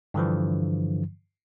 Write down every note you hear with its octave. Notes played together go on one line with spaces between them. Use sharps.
G2 D3 E3 F3